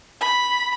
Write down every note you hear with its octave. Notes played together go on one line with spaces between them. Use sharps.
B5